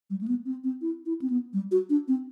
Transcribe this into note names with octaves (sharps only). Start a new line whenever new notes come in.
G3
A3
B3
C4
C4
E4
E4
C4
B3
G3
F#4
D4
C4